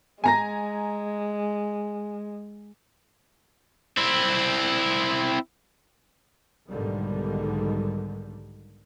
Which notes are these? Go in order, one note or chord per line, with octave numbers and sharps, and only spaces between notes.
G#3 G#5 A#5 A#6
C4 E4
B1 G#2 D3 D#3 G3